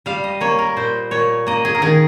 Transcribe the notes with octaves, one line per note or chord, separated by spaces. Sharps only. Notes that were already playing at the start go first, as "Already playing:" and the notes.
G3 F5
D#5
A#3 C#5
A#4
A#2 C5
A#2 C#5
A#3 D#5
G#4
A#4
D#3 G#4